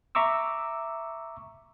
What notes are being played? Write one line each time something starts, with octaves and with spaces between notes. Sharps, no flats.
E5 A#5 C#6 D6 E6